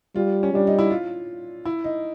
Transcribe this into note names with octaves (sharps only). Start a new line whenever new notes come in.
G3 F4
C#4
G3 D4
D#4
E4
F4
E4
D#4